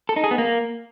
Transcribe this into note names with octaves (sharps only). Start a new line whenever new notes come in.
A4
D#4
G#4
B3
A#3